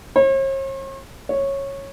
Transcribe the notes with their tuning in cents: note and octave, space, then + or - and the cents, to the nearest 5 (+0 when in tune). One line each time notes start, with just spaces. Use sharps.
C#5 -45
C#5 -10